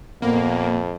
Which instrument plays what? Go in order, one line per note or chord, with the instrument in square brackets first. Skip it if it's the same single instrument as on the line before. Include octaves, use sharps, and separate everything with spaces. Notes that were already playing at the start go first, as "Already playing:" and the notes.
[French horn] F2 [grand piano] A#2 [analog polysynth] A#3 [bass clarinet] B3